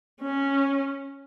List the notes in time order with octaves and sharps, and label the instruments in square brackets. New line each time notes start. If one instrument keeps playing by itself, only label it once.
[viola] C#4